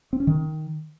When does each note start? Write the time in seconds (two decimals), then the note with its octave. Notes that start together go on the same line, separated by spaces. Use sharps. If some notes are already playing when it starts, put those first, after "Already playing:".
0.13 C4
0.20 C#4
0.27 D#3